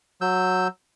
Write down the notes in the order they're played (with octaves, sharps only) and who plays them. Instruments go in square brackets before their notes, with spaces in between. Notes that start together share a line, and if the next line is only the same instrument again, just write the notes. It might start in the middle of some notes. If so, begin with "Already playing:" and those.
[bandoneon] F#3 E6 G6